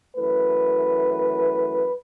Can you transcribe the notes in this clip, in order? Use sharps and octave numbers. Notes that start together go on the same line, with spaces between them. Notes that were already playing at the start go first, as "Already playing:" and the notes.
F#2 E3 A3 B4